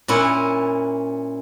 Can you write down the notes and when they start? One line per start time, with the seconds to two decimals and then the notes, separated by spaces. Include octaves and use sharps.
0.08 A#2 C#4 E4 F#5